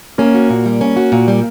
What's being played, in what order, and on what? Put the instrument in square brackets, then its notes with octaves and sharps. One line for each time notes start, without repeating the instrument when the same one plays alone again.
[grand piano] A#3 [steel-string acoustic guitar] C#4
[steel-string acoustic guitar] F#4
A#2
G3
C#4
F#4
A#2
G3